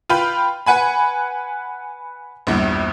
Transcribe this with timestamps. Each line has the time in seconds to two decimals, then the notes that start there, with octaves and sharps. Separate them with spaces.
0.09 F4 B4 G5 B5
0.66 B4 F#5 G#5 B5
2.47 A#1 E2 G2